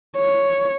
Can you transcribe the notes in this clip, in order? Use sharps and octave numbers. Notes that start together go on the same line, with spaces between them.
C#5